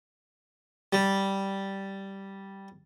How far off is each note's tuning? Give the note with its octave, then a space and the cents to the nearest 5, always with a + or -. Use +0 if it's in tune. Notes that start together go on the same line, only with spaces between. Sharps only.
G3 -5